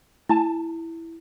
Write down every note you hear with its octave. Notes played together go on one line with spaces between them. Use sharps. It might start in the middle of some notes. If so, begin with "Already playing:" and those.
A3 E4 G#5 A5